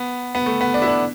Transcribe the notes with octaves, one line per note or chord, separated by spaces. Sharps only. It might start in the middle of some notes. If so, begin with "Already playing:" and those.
Already playing: B3
B3
A3
B3
D4
E4
D4